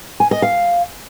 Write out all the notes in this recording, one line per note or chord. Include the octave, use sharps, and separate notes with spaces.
G#5
D#5
F5